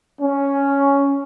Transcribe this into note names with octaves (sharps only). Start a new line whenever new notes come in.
C#4